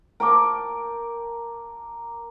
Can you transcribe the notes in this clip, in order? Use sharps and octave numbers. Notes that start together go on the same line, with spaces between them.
A#4 G5 A5 D6